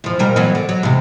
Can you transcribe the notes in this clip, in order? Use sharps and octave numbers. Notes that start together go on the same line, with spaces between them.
E2 F3
A#2 G3 A#4
E3 F#3 B3
D3
F#3
E2 C3